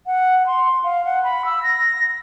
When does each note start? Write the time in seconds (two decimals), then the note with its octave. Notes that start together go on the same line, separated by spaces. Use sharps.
0.06 F#5
0.47 C6
0.84 F5
1.05 F#5
1.24 B5
1.45 E6
1.63 A#6